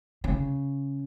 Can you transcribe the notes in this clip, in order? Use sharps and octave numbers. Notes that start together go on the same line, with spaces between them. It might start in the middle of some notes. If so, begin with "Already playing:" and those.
C#3